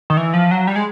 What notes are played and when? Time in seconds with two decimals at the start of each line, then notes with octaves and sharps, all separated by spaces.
0.10 D#3
0.17 E3
0.34 F3
0.51 F#3
0.67 G3
0.76 G#3